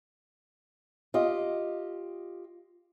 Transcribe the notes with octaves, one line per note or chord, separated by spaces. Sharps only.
F4 G4 D#5